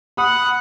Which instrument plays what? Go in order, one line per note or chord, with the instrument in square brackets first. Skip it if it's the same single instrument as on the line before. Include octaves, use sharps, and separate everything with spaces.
[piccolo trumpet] F#5 [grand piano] B5 D#6